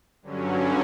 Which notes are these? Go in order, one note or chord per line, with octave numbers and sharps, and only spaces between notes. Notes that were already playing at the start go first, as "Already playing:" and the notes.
G2 D3 F#3 C#4